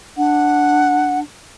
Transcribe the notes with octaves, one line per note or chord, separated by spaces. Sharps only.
D4 F#5